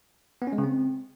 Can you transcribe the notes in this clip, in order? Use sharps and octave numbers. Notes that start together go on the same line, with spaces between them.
B3
C#4
G#3
C#3
C4